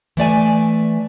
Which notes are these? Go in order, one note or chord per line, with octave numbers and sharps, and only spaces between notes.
E3 A3 D5 G#5